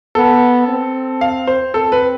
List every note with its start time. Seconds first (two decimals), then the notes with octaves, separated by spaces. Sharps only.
0.15 B3 A4
0.68 C4
1.21 F5
1.47 C5
1.74 C4 A4
1.92 B4